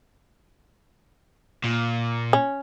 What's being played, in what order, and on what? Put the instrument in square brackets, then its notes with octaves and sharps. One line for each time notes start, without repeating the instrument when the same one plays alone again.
[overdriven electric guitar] A#2
[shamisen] C#4